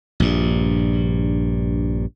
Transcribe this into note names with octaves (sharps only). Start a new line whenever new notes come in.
A#1 G2